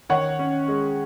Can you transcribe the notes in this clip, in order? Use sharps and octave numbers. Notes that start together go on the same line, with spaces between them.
D#3 C#5 F#5
C#4
G#3